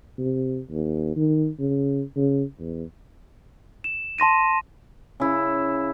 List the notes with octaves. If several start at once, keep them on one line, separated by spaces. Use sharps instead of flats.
C3
D#2
D#3
C#3
C#3
E2
E7
A5 C6 A#6 D#7
C#3 E4